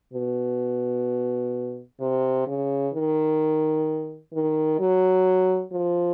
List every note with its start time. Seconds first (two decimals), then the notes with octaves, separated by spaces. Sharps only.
0.13 B2
2.00 C3
2.47 C#3
2.94 D#3
4.33 D#3
4.79 F#3
5.73 F3